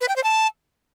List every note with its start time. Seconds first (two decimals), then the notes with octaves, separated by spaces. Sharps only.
0.01 B4
0.08 G5
0.16 C5
0.24 A5